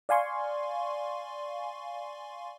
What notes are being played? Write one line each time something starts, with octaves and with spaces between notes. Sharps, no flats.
D5 F5 G#5 C6 C#6